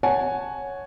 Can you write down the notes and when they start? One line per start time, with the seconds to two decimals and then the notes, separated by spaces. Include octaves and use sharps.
0.03 C#5 F#5 G#5 A5